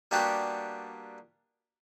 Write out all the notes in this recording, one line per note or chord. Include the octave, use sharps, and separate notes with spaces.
G3 A#3 B3 D4 F#4 G4